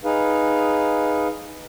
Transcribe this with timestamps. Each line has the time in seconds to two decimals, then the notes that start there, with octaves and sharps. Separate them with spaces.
0.04 D#4 G#4 B4 F5